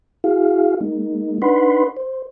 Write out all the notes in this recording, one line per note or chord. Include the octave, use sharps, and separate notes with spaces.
E4 F#4 G#4 F5
G#3 A#3 D#4
D4 D#4 B4 F#5 B5 C6
C5